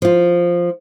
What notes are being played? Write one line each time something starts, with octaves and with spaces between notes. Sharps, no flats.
F3 F4